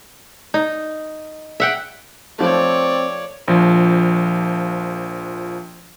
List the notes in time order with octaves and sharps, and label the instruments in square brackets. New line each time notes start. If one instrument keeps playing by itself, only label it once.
[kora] D#4
E5 F#5 G5
[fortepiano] F3 A3 [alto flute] C4 [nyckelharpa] C#5 D5
[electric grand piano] A#1 F3